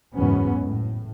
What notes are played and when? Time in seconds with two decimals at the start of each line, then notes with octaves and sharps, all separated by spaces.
0.15 F#1 E2 G#2 F#3 B3 C#4
0.66 A2